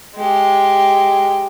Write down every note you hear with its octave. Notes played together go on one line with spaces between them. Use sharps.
G#3 G4